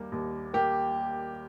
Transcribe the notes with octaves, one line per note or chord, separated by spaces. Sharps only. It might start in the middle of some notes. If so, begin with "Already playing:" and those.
Already playing: D#2 G3 A#3
D#2
A#3 G4